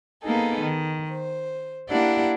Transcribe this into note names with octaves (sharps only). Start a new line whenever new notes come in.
A#3 B3 D#4 G#4 A4
D#3
C5
A#3 D4 E4 G4 D5 F#5